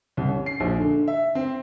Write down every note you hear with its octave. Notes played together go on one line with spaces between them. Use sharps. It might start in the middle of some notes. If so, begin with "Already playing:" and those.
C2
C#4
C7
A#1
D3
E5
C4